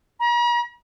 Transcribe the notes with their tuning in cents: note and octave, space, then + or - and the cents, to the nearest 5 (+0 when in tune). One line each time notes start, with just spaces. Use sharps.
A#5 +45